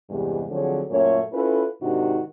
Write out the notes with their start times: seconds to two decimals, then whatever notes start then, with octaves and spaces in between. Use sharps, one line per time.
0.10 E2 G2 C3 G#3
0.50 D3 F3 F#3 C4 G#4 C#5
0.90 F#2 A#2 A3 C#4 C#5
1.33 C#4 E4 F4 A4 B4
1.81 G#2 C3 D#3 D4 D#4 F#4